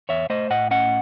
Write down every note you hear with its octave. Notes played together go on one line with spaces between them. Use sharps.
E2 C#5 E5
A3 C5 D#5
A2 D#5 F#5
C#4 D#5 F#5